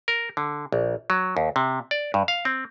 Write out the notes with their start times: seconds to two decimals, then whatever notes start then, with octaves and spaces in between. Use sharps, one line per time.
0.08 A#4
0.37 D3
0.72 A#1
1.10 F#3
1.37 D#2
1.56 C3
1.91 D5
2.14 G2
2.28 F5
2.45 C4